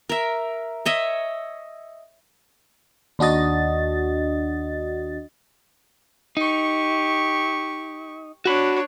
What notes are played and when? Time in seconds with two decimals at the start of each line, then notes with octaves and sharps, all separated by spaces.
0.09 A#4 E5
0.86 C#5 D#5 E5
3.19 D#2 D4 F#4 D#5 A6
6.37 D#4 G4 C#6
8.45 D4 F#4 C#5 B5